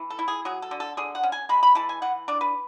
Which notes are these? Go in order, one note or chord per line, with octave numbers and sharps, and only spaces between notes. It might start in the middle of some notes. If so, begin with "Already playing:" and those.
Already playing: E3
A4
E4
G#4
F#3 G#4
A4
D3
A4
D3 G#4
F#5
C#4
G#5
G#3 B5
B5
E3 A5
G#5
E3 F#5
D4 D5
B4